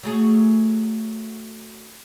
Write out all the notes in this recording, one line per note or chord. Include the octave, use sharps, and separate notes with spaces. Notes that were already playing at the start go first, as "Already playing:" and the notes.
F#3 A3 G#4